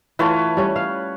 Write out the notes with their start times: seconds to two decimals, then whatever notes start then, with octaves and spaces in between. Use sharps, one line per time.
0.19 E3 A3 F4 B4 C#5 A5
0.57 G3 C#4
0.76 F5